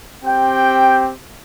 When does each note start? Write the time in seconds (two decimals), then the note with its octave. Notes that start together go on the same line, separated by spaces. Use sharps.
0.23 C4 G4 G5